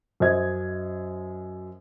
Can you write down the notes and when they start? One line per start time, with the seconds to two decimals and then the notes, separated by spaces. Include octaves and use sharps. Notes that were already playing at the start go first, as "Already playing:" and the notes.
0.20 F#2 C5 D#5 G#6